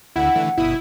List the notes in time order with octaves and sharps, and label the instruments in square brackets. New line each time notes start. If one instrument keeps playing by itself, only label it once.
[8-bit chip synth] D2 D3 [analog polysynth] E4 [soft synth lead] F#5
[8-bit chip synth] D3 E3 A3
[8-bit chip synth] G1 B2 D#6 [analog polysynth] E4